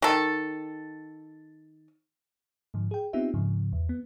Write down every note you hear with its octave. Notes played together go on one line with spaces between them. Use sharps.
D#3 A4
G#2 D3 F3
G#4 G5
B3 C4 D#4 F4 G4 E5
G#2 C#3 F3
E2
B3